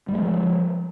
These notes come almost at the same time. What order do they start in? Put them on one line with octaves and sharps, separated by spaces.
G3 G#3 F3